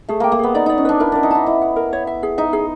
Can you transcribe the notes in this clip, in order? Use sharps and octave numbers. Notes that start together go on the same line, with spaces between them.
A3 G#4
A#3 G5
A#3
B3 G#4
D#4 D5
D#4 D5
C#4
D4 B4
E4 A#4
D4 A#4
D#4
E4 A5
E4 D#5
F#5
A#4
C#5
E5
G#4
D#4 E5
G#4